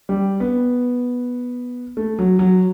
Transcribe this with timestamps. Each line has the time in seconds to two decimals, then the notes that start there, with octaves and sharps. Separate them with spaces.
0.09 G3
0.40 B3
1.97 A3
2.19 F#3
2.39 F#3